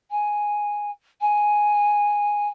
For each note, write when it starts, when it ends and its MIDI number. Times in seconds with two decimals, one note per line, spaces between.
0.11 0.91 80
1.21 2.48 80